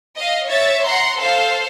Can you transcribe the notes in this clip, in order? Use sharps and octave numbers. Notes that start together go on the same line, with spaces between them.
D#5 F5
C#5 E5 A6
F#5 A#5 C6
A4 C5 F5